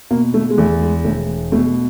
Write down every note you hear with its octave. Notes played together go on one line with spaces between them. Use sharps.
B2 A#3
A3
G#3
E2 A3
G#3
E1 A3
B2 A3